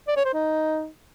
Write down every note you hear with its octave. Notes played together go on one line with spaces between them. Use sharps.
D5
C#5
C5
D#4